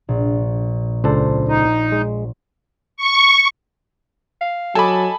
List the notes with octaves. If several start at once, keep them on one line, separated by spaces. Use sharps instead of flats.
A#1
C#2 D4 A4 C5
D#4
G#3
C#6
F5
F#3 A4 D#5 G#5 A5 B5 D6